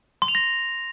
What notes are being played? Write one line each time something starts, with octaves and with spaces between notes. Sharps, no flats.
C6
F7
A#6